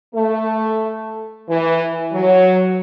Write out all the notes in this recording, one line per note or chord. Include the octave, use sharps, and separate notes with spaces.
A3
E3
F#3